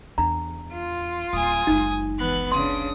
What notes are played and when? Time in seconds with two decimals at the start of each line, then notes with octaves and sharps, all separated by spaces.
0.18 E2 D4 A#5
0.73 F4
1.33 D1 G#5 D#6
1.67 F#1 C#2 D#4
2.18 E3 B3 F#6
2.52 C#3 D4 C6 D#6